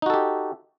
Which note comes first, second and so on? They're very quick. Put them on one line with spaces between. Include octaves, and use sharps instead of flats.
D#4 F#4 A4 G4